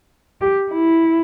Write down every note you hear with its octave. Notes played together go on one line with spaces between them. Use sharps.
G4
E4